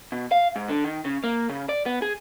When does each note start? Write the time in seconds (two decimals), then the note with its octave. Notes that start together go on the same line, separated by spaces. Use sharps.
0.12 B2
0.31 F5
0.56 G#2
0.69 D3
0.84 D#3
1.05 C#3
1.24 A#3
1.49 C#3
1.69 D5
1.86 B3
2.02 G#4